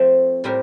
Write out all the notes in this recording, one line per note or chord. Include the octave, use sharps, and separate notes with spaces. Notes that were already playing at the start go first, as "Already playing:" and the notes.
Already playing: F3 A3 C4
A2 G3 C4 G4 A#4